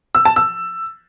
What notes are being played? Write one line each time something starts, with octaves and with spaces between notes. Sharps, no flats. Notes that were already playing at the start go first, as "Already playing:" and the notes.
E6
A5
E6